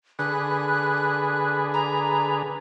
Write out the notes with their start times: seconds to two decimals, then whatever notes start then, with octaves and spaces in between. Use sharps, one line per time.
0.19 D3 G#4 B4 F#6
1.74 A#5